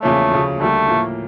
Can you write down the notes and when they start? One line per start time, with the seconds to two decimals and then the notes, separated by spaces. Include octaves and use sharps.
0.02 E2 C#3 F3 A3 A#3 C#4
0.31 D2 C#3 F3
0.60 D2 D3 G3 A3 A#3
0.89 A2 F3 A#3